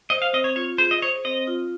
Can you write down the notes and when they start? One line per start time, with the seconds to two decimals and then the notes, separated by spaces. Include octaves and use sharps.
0.10 C5 D#5
0.22 F5
0.33 C4 D#5
0.44 C#5
0.56 F4 C#5
0.78 G#4 C5
0.91 D#5
1.02 C5 C#5
1.25 C4 D#5
1.48 F4